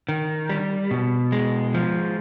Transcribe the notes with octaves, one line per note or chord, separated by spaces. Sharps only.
D#3
G3
B2
G#3
F3